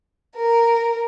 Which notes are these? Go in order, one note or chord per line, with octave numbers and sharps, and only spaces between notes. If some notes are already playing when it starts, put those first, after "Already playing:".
A#4